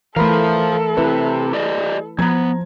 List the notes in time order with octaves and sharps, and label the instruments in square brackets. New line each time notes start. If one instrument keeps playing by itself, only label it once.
[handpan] E3 A3 [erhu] A4 [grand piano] A#4 B5 [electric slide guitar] C5 F5
[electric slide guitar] C3 [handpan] E4 B4
[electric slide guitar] G4 D5 D#5
[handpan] F3 [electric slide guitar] B3 C4 [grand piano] A#5 G#6